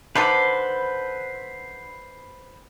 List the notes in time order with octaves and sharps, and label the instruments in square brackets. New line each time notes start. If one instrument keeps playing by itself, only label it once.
[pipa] D3 D#3 A4 [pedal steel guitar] B4 C5